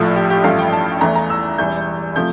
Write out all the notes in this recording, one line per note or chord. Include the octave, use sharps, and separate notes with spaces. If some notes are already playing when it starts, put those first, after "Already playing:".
Already playing: A#1 A2 F3 A3
G4
G4
A1 G2 F3 A3 F5
G5
A5
E2 E3 A3 A#5
A#5
E6
E1 E2 E3 G3 G6
C3 F3 A3 G6